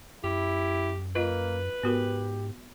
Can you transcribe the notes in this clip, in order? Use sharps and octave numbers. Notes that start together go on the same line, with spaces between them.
F#2 E4 G4
A#3 F4 B4 D#5
G#2 B3 F#4 G4 A#4